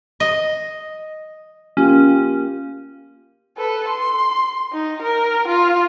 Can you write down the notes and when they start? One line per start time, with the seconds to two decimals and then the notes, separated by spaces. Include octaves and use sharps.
0.20 D#5
1.77 A#3 C#4 F4 G4
3.58 A4 B4
3.88 C6
4.73 D#4
5.02 A#4
5.48 F4